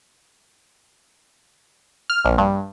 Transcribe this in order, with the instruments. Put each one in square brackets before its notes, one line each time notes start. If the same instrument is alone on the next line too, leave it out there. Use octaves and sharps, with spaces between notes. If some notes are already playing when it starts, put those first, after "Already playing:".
[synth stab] F6
A#1
G2